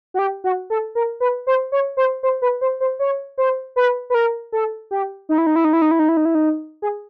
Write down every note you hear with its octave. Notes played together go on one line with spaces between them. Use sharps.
F#4
G4
F#4
A4
A#4
B4
C5
C#5
C5
C5
B4
C5
C5
C#5
C5
B4
B4
A#4
A4
G4
D#4
E4
D#4
E4
D#4
E4
D#4
E4
D#4
E4
D#4
E4
D#4
G#4